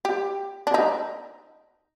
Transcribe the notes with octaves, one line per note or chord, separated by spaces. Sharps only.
G4
D4
D#4